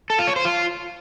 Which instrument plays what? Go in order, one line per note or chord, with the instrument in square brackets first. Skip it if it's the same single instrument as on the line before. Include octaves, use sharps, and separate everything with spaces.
[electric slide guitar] A4
F4
C#5
C5
F4